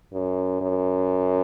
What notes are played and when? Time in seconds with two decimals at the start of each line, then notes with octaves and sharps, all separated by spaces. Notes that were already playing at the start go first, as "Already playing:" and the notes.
0.13 F#2
0.62 F#2